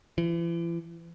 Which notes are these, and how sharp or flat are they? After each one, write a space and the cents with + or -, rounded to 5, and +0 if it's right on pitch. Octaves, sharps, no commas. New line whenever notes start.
E3 +40